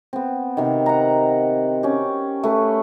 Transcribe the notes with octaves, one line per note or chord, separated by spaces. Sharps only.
B3 C4
C3 D#3
F#5 A#5
C#4 G4
A3 B4